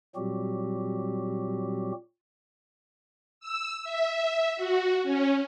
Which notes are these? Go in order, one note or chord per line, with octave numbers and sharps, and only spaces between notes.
A#2 F#3 G3 C4 F#4 G4
E6
E5
F#4
C#4